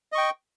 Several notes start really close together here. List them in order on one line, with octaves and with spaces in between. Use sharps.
D#5 C#6 G5